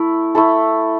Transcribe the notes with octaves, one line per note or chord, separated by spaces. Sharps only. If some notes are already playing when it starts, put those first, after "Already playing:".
Already playing: A3 E4
A3 E4 A4